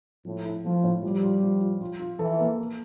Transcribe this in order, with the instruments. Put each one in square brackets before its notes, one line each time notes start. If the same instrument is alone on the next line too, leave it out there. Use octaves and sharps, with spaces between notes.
[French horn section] A2 [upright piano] F3
[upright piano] E4
[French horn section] F3 [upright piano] A3
[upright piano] A2
[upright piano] F3 [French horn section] G3
[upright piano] F4
F3
F4
F4
F4
[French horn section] E3 [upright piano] A4
[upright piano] A#3
A4